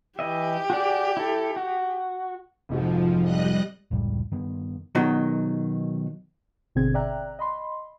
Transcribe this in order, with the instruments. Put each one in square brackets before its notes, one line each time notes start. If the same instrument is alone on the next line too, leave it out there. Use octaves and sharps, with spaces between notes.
[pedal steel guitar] E3 D#5 E5 [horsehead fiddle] G4
[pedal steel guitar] F#4 G#4 D5
E4 A4
F#4
[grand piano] F1 G#2 F#4 [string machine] F3
[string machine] G3 D#5 F#6
[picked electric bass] F1 C#2 A2 G3
G2 D#3 B3
[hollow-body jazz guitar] B2 D#3 F#3
[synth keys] G#1 B2 D3 C4 G#4 G#6
D5 E5 G5 A#5 F#6
D#5 B5 C6